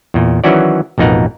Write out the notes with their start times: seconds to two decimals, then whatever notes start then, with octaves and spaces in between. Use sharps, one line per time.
0.14 E2 A#2
0.44 D#3 E3 F#3 C#4 F#4 D5
0.98 A1 F2 B2 D#4 A#4 F#5